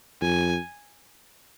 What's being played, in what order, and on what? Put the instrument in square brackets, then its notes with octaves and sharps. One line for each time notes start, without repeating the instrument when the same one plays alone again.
[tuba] F2 [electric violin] G#5